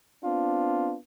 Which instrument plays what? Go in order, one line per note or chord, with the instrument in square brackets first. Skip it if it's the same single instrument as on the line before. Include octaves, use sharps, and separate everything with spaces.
[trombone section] B3 C4 D4 F4